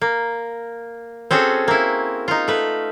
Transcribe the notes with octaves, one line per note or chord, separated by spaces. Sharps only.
A#3
C4 C#4 F#4 G#4 A4
A#3 E4
D#4 F4
A3 B4